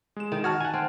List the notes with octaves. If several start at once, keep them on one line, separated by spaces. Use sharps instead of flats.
G#3 E7
D#3
F#4 A5 F6 G#6
F#5 G#5
C4